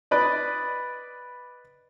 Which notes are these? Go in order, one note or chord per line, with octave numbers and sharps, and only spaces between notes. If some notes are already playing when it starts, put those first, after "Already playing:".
B4 D5 D#5